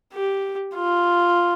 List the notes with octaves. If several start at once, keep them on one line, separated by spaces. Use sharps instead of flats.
G4
F4